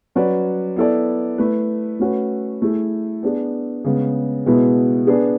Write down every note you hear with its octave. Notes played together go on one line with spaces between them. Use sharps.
F#3 C#4 F#4 B4 D5
B3 E4 A4 D5
A3 E4 B4
A3 C#4 F#4 B4
A3 E4 G#4
B3 D4 G#4
C#3 G#3 B3
B2 G#3 B3 E4 B4
B3 D4 G#4 B4